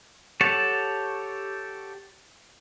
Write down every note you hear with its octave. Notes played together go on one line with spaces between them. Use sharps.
G4 A4 C#5 F#5 A5